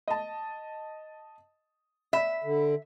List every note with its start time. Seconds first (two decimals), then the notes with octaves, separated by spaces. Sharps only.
0.08 D#5 A5
2.13 E5 B5
2.44 D3